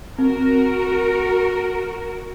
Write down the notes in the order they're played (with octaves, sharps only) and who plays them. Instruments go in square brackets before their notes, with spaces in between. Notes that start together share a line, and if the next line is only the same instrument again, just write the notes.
[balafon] C4 [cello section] F#4 A#4